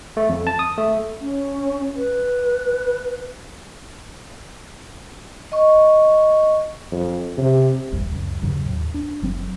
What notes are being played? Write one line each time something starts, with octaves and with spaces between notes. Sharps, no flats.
A3
F2
A5
D#6
A3
C#4
B4
D#5 C#6
F2
C3
E1 A#1 E2 G2
C#2 F#2
E2 G2 C#3 F#3
D#2 A2
D4
F#1 F#3 C4